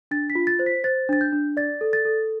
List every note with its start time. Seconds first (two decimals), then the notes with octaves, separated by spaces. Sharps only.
0.11 D4 A6
0.30 B6
0.35 F4
0.47 A6
0.59 C5
0.66 B6
0.84 C5 A6
1.09 D4 A6
1.21 G6
1.32 D4
1.57 D5 A6
1.81 A4
1.93 A6
2.05 A4